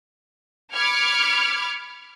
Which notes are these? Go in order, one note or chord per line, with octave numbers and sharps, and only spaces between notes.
B5 D6 F6 G#6 C#7